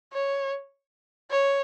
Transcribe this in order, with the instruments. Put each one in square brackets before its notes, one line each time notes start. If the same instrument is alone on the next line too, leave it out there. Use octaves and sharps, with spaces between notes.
[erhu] C#5
C#5